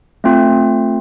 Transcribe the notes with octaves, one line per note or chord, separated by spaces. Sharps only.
A3 C4 F4